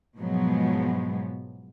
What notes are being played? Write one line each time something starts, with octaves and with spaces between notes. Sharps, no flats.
G#2 B2 F3 F#3 G#3 B3